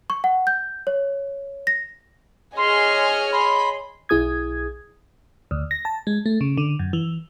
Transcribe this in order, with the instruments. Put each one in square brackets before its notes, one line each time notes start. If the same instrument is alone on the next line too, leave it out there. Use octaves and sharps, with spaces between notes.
[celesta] C#6
F#5
G6
C#5
A#6
[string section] G#4 C#5 D#5 [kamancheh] G#5 F6 [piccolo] C6
[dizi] B5 [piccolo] C6
[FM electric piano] B1 E4 G#4 D#6 G#6
D2
A#6
A5
G#3
A3
C#3
D3
F#2
E3